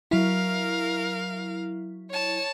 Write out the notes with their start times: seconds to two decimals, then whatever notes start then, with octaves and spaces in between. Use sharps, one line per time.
0.11 F#3 E4 A#4 F5
2.10 C#5 A5